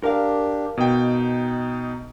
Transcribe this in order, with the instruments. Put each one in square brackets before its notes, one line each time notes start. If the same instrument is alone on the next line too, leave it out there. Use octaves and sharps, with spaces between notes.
[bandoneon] D4 G4 [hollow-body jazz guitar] A#4 F5
[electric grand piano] B2 G5 [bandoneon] D#4